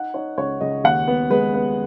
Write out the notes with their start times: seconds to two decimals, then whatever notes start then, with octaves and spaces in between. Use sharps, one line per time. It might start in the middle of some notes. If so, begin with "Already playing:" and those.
Already playing: D#4 F#5
0.14 D#4 C#5
0.37 C#2 C#5
0.61 C#2 D#5
0.84 D#2 F#5
1.08 B3
1.30 G#3 B4
1.54 B3